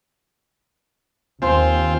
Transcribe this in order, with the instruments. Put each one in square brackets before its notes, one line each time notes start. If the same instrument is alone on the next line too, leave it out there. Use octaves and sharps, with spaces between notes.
[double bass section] D#2 [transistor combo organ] C4 F4 [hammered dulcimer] C5 G#5